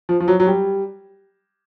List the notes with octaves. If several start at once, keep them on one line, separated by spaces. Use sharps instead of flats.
F3
F3
F#3
F#3
G3